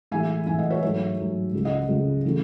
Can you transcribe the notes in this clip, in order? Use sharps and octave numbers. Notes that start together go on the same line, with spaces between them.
A2 E3 G#3 E5 G#5
A2 E3 G#3 E5 G#5
D#5 F#5
C#5 E5
G#2 F#3 A3 C#5 E5
G#2 F#3 A3
C#2 C#3 G#3
D#5 F#5
C#2 C#3 G#3
C#3 E3 A3